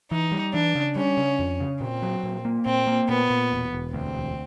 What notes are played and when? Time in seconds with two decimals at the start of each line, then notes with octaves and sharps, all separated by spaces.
0.11 E3 D#4
0.32 G3
0.54 E3 D4
0.75 C#3
0.96 G3 C#4
1.17 C#3
1.39 F2
1.60 C#3
1.81 A#2 C4
2.02 F#3
2.23 A#2
2.45 A#3
2.66 A#2 C4
2.87 A#3
3.09 A#2 B3
3.30 A#2
3.52 E1
3.73 E1
3.93 D2 C4
4.14 E1